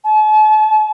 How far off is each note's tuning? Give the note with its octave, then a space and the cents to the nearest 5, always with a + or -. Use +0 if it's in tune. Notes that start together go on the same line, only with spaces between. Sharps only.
A5 -45